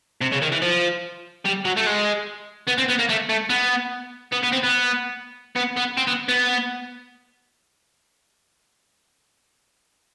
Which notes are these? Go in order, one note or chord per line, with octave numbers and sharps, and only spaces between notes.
C3
C#3
D#3
E3
F3
G3
F#3
A3
G#3
B3
C4
B3
A#3
A3
A3
B3
B3
B3
C4
B3
B3
B3
C4
B3
B3